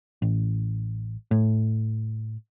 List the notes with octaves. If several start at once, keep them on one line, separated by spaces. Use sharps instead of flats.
A1
A2